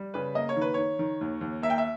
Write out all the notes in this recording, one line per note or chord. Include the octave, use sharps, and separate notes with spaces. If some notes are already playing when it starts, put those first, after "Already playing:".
Already playing: G3
C#3 B4
A#3 D#5
C#5
D#3
B4
D#3 C#5
D#3
D#2
D#2
A#3 E5
G5
E5